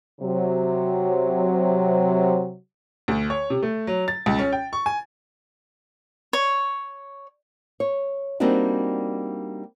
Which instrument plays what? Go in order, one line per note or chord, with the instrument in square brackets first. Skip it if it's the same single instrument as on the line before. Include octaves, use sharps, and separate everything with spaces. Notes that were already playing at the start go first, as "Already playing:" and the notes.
[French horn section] C3 F#3
[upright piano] D2
C#5
C3
A3
F#3
A6
C#2
C#4
G5
C#6
G#5
[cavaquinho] C#5
[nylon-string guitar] C#5
G3 A#3 C4 D4 D#4 F#4